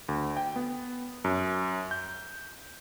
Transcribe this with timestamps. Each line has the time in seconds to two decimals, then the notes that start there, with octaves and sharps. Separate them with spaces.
0.09 D2
0.37 G5
0.56 B3
1.24 F#2
1.91 G6